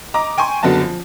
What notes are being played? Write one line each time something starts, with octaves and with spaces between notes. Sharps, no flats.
D#5 A#5 D6
G5 G#5 C6 C#6
F#1 D3 F#3 B3 F#4 A5
F3